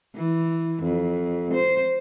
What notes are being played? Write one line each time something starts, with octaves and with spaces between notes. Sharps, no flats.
E3
F2
C5